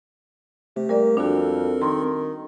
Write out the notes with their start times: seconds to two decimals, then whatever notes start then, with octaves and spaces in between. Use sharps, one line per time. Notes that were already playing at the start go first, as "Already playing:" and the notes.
0.76 C3 A3 G4
0.89 G3 A#3 A#4 D5
1.17 F2 C4 D4 F#4 A4 A#4
1.82 D#3 C6